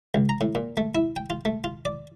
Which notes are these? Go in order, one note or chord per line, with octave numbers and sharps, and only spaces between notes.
C#2
A#5
A2
A#2
A3
E4
G5
F4
A3
F4
D5